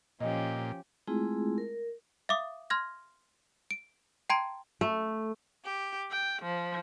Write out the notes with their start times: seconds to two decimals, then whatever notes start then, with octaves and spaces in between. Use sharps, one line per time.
0.20 A#2 F3 C#4 G4 D#5
1.07 G#3 A3 C4 E4 F4 G#4
1.58 A#4
2.29 E5 F5 D6 D#6
2.70 C6 F6 G#6 A#6
3.71 D7
4.30 G5 A5 A#5 C6 G#6 D7
4.81 A3
5.64 G4
6.10 G5
6.42 F3